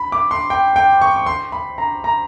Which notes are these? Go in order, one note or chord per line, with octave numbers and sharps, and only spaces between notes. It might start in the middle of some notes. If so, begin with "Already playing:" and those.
Already playing: B5
D6
C6
G5
G5
C#6
C#6
C6
B5
A#5
A#5